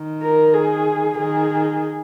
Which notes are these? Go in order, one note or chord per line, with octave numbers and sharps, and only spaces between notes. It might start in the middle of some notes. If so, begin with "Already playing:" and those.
Already playing: D#3
A#4
G#4
D#3 G#4